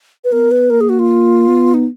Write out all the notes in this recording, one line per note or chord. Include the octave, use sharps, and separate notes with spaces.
B4
B3 A#4
B4
A#3 A#4
G#4
F#4
F4
B3
D#4